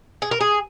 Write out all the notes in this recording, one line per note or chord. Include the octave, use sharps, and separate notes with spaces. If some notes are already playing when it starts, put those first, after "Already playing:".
G#4
A#4
G#4